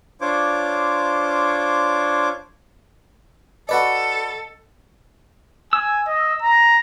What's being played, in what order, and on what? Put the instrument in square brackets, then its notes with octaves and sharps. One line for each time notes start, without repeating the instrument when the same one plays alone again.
[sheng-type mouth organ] D4 F4 C5 C#5 D6
[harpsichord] F#4 B4 D5 [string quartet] A4 [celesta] D#5
[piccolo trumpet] G#5 [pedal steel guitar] E6
[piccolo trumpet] D#5
A#5